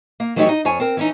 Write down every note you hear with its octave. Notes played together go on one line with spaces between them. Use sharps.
A#3
E3 F#3 A3 D#4 G4 C#5
D#4
F2 C#5 G#5
C4 A#4
E3 C#4 D#4